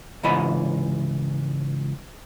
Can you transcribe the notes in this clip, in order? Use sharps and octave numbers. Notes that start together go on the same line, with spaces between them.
C#2 G#2 E3 D#5 B5